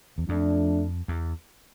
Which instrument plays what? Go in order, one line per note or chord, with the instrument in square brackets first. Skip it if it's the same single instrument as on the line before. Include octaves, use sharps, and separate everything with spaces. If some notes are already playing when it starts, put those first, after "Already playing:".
[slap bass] E2
[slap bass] F2 [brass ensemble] F3 A3 D4
[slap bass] E2